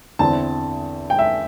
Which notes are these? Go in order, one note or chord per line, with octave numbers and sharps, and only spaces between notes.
E2 D3 C4 E4 A5
G5
E5